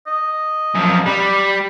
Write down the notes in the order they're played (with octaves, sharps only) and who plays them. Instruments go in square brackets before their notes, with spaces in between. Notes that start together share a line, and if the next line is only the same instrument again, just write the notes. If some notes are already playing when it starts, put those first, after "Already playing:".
[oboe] D#5
[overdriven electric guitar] F#2 F3
[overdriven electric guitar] G3 [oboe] B5